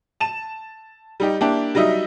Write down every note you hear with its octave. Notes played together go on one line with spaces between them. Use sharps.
A5 E7
G3 D#4 G4
A#3 D4 E4 G4
F#3 G3 D#4 D#5 E5